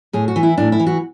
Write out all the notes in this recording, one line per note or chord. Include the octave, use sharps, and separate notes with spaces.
A2 G#4
F#4
E3
E4
A2 D4
E4
E3
F#4